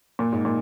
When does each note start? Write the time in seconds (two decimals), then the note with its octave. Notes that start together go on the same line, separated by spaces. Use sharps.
0.19 A#2
0.32 G#2
0.45 A#2